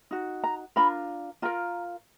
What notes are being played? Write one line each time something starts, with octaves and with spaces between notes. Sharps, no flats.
D#4 F#4
A#5
D4 F4 A#4 B5
F4 A#4 A#5